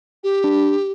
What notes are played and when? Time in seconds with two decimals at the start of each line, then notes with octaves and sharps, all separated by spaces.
0.24 G4
0.44 D4